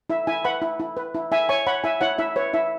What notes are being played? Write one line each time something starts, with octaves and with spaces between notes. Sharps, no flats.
E4 E5
E4 E5 G#5
B4 F#5 B5
E4
E4
B4
E4
E4 E5 G#5
C#5 G#5 C#6
C#5 F#5 B5
E4 E5 G#5
E4 C#5 F#5
E4 E5
B4 C#5
E4 E5